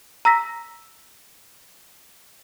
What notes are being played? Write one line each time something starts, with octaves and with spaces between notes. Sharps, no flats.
A#5 E6 A#6 B6